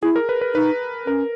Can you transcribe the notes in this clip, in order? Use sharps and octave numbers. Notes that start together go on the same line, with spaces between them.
E4 G#4
A#4
B4
B4
D#4 B4
C#4 A#4